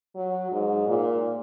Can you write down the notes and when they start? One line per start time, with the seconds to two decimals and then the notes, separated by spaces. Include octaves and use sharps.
0.16 F#3
0.51 G#2
0.87 A#2